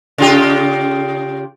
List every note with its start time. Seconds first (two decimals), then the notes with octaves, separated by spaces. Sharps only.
0.18 C#3 F4 G4